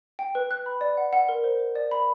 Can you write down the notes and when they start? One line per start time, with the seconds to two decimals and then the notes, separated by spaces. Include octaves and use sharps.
0.19 G5
0.35 B4
0.51 F#6
0.66 B5
0.81 D5
0.97 F#5
1.13 F#5
1.29 A#4
1.44 C5
1.59 C5
1.75 D5
1.91 B5